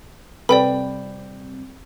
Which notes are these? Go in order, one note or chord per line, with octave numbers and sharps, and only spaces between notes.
C3 G3 C4 A4 B4 D5 G5 B5